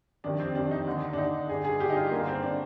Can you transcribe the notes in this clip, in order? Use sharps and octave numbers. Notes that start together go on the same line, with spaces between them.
F2 C3 D#3 D4
C4
F2 C3 D#3 D4
D#4
D#2 D3
D4
D#2 D3 D#4
G2 D3 G#4
G#4
G2 D3 G4
D#4
F4
G2 D3 A#3
C4
D3 D4